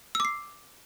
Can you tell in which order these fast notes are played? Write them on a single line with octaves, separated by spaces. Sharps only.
E6 D6 C7